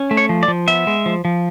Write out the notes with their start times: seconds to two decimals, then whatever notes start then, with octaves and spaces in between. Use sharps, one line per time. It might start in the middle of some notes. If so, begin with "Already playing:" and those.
Already playing: C#4
0.11 A3
0.17 C#5
0.29 F3
0.43 D5
0.48 F3
0.68 B3 E5
0.87 G#3
1.06 F3
1.25 F3